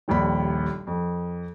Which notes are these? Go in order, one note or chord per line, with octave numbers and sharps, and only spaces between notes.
D#1 A#1 D#2 B5
F2